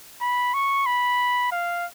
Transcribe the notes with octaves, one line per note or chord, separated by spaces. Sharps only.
B5
C#6
B5
F5